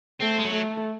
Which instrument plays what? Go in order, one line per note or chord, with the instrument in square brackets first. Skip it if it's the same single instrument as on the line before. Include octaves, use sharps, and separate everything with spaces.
[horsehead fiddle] A3 [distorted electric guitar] C4
[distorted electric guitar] G#3
F#3
[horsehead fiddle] A3